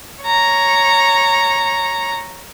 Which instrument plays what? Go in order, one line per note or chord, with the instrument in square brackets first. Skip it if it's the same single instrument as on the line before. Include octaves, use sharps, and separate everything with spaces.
[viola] C#5 A#5